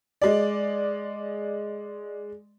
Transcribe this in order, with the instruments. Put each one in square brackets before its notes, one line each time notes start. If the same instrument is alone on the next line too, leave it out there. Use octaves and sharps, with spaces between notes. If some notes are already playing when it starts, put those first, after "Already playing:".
[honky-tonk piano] G#3 D5